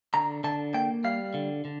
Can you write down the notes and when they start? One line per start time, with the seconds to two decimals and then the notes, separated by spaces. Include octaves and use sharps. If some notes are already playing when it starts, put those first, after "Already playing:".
0.14 D3 A#5
0.44 D3 A5
0.74 A#3 G5
1.04 G3 F5
1.34 D3
1.65 D3